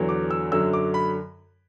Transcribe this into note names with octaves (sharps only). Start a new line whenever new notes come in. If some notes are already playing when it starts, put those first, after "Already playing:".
Already playing: E2 D3 F#3
D6
E6
F#2 D3 F#3 E6
D6
B5